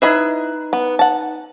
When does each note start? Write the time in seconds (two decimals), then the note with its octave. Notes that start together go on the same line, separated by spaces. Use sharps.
0.02 D#4 E4 B4 D#5 B5
0.73 B3
0.99 F#5 A5